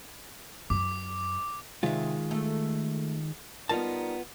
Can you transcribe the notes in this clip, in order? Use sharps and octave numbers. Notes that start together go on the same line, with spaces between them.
F#2 D6
C3 D#3 G#3 F4 E5
A3
G3 B3 D#4 F4 A#4 A5